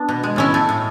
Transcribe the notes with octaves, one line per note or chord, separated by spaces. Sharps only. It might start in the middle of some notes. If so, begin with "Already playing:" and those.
Already playing: B3 D4
B2
G#3
A2 C#4 E4
A3
A2